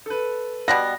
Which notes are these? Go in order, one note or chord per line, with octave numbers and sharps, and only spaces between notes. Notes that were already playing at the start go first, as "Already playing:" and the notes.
A4 B4
B2 G3 B3 A#6